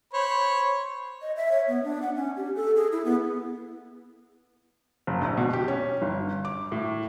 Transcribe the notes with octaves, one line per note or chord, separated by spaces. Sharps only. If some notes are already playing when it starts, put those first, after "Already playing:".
C5 C#5 B5
D#5
E5
C#5
B3
D4
F#5
C#4
G4
A4
G#4
E4
B3
F#1
A#1
B2
G4
C#4
G1
D6
A2